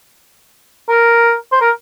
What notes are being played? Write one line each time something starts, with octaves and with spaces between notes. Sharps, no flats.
A#4
C5
A#4